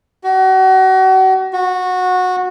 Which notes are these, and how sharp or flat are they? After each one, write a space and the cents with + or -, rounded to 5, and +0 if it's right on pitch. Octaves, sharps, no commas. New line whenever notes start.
F#4 +35
F#4 -15